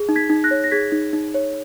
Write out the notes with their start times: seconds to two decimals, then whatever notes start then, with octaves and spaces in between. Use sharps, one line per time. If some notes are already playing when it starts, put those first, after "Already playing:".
Already playing: G#4
0.09 D#4
0.16 G#6 B6
0.30 D#4
0.44 F#6 A#6
0.51 C#5
0.64 A#6
0.71 G#4 G#6 B6
0.92 D#4
1.13 D#4
1.34 C#5